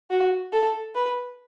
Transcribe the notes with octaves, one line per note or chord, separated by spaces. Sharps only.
F#4
A4
B4